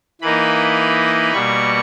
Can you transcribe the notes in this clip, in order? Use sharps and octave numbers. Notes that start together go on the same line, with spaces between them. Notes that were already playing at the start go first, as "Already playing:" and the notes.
E3 A#3 D#4 B5
B2 G3 A#3 C#6